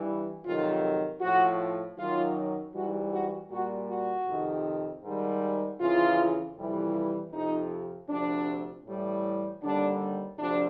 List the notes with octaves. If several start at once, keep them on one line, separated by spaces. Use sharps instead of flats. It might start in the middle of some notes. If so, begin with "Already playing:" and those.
Already playing: G2 E3 G3
F2 C3 D#3 F#3 F4
A2 F3 F#4
F#2 D#3 F#3 F4
G#2 E3 G3 F#4
F#4
A#2 G3 F#4
F#4
F2 C3 D#3
G#2 D#3 G3
F2 C#3 E3 F4
F2 C3 E3 G3
F2 C3 F3 D#4
D2 C3 F3 D4
A2 E3 G3
D#2 D3 G3 D4
D2 C3 F3 D4